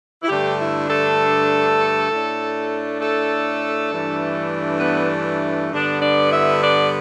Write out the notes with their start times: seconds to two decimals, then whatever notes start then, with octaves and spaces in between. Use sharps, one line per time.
0.23 E4
0.28 G2 D3 A3 D4 G4
0.58 E4
0.88 A3 A4
2.09 A2 A3 D4
3.00 A3 A4
3.90 G2 E3 A3 D4
4.80 B3 B4
5.71 G2 D3 B3 D4
6.01 D4 D5
6.31 E4 E5
6.61 D4 D5